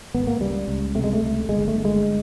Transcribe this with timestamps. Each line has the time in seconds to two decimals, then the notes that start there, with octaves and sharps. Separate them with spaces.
0.14 G#1 B3
0.27 A#3
0.40 C#2 G3
0.68 C#2
0.95 C3 A3
1.04 G#3
1.13 A3
1.23 C#2
1.49 G1 G#3
1.68 A3
1.76 G1
1.85 G#3